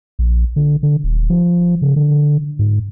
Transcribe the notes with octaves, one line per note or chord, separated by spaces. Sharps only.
A#1
D3
D3
D#1
F3
C#3
D3
G#2